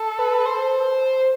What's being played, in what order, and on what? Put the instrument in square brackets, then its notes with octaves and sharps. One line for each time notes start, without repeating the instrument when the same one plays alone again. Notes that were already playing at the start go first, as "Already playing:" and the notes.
Already playing: [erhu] A4
[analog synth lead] B4
C5